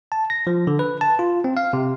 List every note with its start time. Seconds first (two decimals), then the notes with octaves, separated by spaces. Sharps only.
0.12 A5
0.30 A#6
0.47 F3
0.67 D3
0.79 B4
1.01 A5
1.19 F4
1.44 C4
1.57 F5
1.73 C3